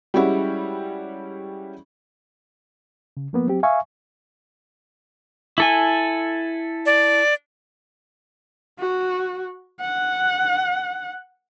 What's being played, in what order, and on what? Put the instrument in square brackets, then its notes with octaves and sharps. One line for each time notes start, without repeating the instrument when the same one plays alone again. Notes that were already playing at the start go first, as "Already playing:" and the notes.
[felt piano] G3 G#3 C#4 E4 F#4 G4
[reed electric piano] C#3
F3 A#3 B3
F#3 C4 G4
E5 F5 G#5 C#6
[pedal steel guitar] E4 A4 G#5
[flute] D5
[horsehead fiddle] F#4
F#5